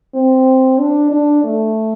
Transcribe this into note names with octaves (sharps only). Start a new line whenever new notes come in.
C4
D4
D4
A3